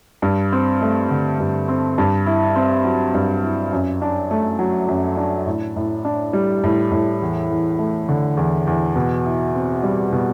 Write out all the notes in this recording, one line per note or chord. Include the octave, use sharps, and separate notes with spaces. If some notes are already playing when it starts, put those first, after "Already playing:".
G2
C4
A3
D3
G2
C4
G2
E4
C4
F#3
G2
E4
F#2
D4
A3
F#3
F#2
D4
A2
A2
D4
G3
A2
A2
E2
E2
A3
D3
E2
E2
B2
E4
C4
G3
B2